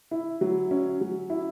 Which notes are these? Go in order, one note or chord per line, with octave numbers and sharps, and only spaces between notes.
E4
F#3
C#4
F#3
E4